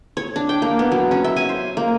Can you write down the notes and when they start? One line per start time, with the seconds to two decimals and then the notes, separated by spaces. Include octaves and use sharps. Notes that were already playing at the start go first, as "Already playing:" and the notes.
0.17 C#5
0.36 D4
0.49 G5
0.62 A#3
0.79 B3
0.92 F#3
1.11 C#4
1.24 E5
1.36 G#5
1.49 C5
1.77 A#3